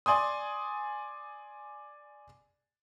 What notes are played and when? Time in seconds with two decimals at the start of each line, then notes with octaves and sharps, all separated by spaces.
0.06 D5 G#5 C6 D#6